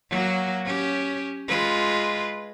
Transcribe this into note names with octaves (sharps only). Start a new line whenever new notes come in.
F#3 A#3 F#4
C#4 G4
G#3 F4 B4